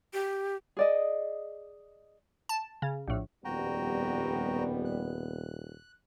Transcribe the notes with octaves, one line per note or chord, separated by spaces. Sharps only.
G4
G#4 D5 D#5
A5
C#3
A#1 A2
D#1 F2 B2 G3 B3 F#4 G5 A#5
F#6